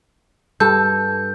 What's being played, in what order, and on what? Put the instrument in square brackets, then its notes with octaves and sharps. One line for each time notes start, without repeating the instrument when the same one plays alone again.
[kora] G2 A4 [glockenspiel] G6